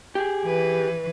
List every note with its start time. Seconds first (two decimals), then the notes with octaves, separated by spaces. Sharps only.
0.15 G4 G#4
0.45 E3 B4